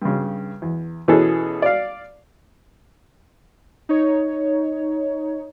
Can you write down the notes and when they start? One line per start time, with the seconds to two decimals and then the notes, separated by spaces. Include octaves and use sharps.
0.02 G2 C#3
0.62 E2
1.08 B2 E3 B3 C#4 G#4 A4
1.62 D5 F5
3.89 D#4 C#5